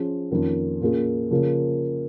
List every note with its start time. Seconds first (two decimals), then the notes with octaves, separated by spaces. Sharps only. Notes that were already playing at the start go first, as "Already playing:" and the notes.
Already playing: F3 C#4 G#4
0.31 F2 D#3 A#3 C#4 A#4
0.81 A#2 A#3 C#4 F4 G#4
1.31 C#3 F3 A#3 F4 G#4